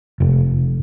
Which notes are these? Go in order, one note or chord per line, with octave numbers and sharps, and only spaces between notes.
F1